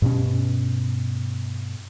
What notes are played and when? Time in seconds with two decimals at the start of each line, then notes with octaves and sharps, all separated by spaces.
0.02 G2 B2 C#4